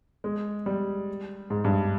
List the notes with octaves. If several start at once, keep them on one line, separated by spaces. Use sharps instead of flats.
G#3
G3
G#2
G2